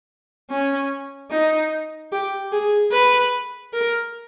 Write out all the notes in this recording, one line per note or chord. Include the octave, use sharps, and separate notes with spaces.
C#4
D#4
G4
G#4
B4
A#4